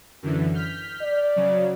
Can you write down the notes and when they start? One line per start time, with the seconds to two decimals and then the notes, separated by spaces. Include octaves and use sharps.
0.23 F#2 D3 E3
0.54 F6 G6 B6
1.01 D5
1.36 C#3 F#3